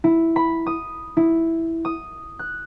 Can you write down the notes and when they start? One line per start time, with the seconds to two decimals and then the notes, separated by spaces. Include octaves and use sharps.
0.04 E4
0.36 B5
0.66 D#6
1.17 E4
1.85 D#6
2.39 F#6